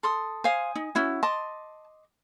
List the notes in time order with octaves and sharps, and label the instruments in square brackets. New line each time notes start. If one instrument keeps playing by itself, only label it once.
[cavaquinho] A4 C6 D#6
[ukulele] C5 F5 [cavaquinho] G#5 D#6
[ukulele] D#4
C#4 E4 F#4
[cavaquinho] D#5 C6 D6 [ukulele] A5